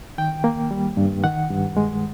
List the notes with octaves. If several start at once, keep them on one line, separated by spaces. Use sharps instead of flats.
D#3 G5
A#3
G3
G2
D#3 F#5
G2
G#3